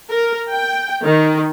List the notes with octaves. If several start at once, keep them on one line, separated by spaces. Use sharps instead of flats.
A#4
G5
D#3